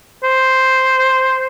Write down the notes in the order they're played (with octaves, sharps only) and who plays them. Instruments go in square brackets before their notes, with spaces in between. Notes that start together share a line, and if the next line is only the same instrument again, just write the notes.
[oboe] C5